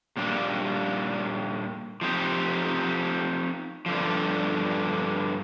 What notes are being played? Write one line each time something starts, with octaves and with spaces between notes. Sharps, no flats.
A#2 G3 D4
F3 C4 D#4 G4
G2 D3 F3